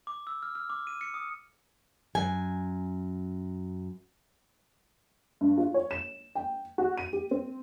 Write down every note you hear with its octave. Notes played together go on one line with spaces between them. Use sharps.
D6
E6
F6
F6
D6
D#7
C#7
D#6
F#2 G#5
G2
F4
C#5
E7
G5
F#4
D#7
G4
C4